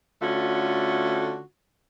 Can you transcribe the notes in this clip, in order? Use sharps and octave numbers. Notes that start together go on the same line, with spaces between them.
D3 A3 C#4 F4 F#4